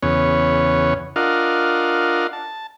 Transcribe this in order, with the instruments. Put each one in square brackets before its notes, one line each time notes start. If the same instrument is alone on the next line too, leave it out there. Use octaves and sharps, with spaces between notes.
[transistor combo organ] E2 C#3 B3 C#5
D4 F4 A#4 D#5 F5 F#5
A5